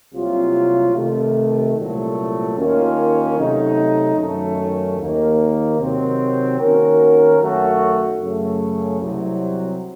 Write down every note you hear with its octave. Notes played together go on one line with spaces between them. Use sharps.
C2 C3 F#3 A#3 F4
C3 D#3 A3
C2 A#2 F#3 A3
D#2 D#3 A#3 C#4 F4
C3 F#3 A3 D#4
F#2 D#3 A3 C#4
D#2 D#3 A#3
C3 D#3 F#3 C4
D#3 A#3 C#4 F#4 A#4
F#2 D#3 A3 C#4 F#4
F#2 C#3 A3
C2 C3 F#3